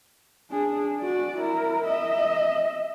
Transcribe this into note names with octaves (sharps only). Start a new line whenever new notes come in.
D4 G#4
F#4 D5
E4 A#4
D#5 E5